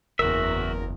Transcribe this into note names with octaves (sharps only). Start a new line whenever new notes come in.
F#1 E2 F#4 A#4 E5